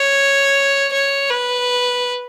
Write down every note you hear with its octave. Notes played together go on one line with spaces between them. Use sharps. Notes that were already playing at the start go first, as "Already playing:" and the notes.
Already playing: C#5
C#5
B4